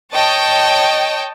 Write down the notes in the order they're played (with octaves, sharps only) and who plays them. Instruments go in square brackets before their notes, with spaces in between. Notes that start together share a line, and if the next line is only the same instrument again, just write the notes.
[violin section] C#5 D#5 G5 A5